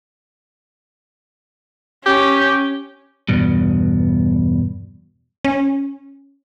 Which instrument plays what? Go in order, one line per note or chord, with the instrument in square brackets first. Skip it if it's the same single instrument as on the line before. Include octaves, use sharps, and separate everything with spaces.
[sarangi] C#4 [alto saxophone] G4
[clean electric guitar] E2 G2 B2
[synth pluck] C#4